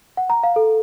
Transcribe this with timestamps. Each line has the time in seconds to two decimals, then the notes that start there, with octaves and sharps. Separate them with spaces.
0.17 F#5
0.30 A#5
0.43 F5
0.56 A4